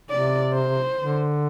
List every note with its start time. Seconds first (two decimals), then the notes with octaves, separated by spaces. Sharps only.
0.10 C3 D5
0.53 C5
0.98 D3